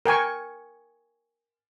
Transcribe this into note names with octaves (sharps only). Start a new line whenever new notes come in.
A#4 G5 G#5 C#6